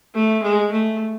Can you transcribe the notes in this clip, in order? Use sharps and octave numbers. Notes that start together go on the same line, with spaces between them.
A3
G#3
A3